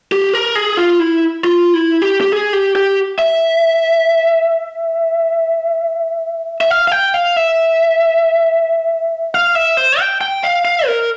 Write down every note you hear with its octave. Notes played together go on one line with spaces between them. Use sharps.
G4
A#4
G#4
F4
E4
F4
E4
G4
G4
G#4
G4
G4
E5
E5
F5
F5
G5
F5
E5
F5
E5
C5
G5
G5
F5
F5
A#4